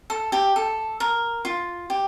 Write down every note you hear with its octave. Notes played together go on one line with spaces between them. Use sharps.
A4
G4
A4
A#4
F4
G4